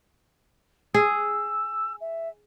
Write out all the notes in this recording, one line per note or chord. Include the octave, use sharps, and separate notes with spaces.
G#4 E6
E5